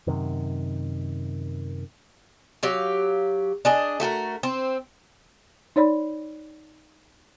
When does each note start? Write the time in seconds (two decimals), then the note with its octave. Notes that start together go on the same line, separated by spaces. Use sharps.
0.07 F#2 C3 D#3
2.63 F#3 G4 F5
3.65 D4 G#4 D#5
4.00 A3 F#4 G4 A#4
4.43 C4
5.76 D#4 C#5 D5 B5